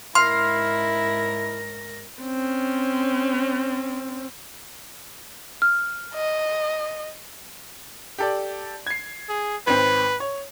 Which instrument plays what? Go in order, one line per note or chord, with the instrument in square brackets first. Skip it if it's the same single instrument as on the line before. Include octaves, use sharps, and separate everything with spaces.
[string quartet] G#2 A#4 A#6 [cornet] E4 [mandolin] F5 [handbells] C6
[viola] C4 C#4
[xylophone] F6
[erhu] D#5
[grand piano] G4 A4 D5
G#6 C7
[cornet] G#4
[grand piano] G#1 C4 [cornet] B4
[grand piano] C#5